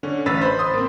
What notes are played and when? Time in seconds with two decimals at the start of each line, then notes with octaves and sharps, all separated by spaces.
0.03 D3 C#4
0.26 A1 B4 E6 A6 B6
0.41 C5 B5
0.59 C6 D#6
0.74 A#3 C4